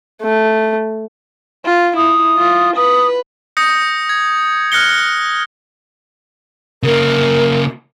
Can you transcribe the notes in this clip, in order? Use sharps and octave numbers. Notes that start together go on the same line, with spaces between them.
A3
F4
E4 D#6
F4
B4 D#6
D#6 G6 A#6 C#7
G#6
F6 F#6 A#6 C#7 G7
C#3 A#3 A#4